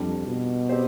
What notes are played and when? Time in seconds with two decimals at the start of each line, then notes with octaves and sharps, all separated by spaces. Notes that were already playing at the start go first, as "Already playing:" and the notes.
Already playing: F2 G3 D4 F4
0.26 B2
0.69 C4 G4 C5